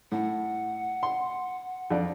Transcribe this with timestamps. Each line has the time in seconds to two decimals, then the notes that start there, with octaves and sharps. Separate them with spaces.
0.12 A2 F#5
1.03 C6
1.91 F2 D4